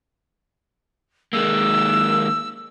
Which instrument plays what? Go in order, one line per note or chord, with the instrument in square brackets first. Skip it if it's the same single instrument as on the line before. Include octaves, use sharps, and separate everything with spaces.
[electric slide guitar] D#3 G#3 A#3 [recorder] E6